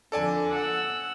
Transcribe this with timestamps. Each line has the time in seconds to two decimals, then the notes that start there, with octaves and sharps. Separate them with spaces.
0.12 F2 D3 A4 D5 G#5
0.52 F#5 E6